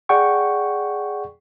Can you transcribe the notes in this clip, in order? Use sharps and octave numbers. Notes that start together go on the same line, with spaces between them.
G#4 D5 F#5 G5 C#6